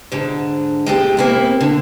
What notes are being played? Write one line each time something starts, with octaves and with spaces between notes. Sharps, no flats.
G#2 D3
G#3 A3 G4
A#3 C4 E4
D3